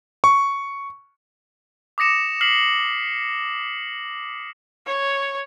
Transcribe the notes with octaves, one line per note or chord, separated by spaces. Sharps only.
C#6
D6 D#6 A#6 C#7 E7
F6 B6 C7 E7 F#7
C#5